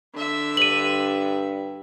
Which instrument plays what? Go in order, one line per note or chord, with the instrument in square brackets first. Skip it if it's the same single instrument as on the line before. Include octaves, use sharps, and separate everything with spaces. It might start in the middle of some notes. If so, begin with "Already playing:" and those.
[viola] D3 E5
[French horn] G2 [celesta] D#7 F#7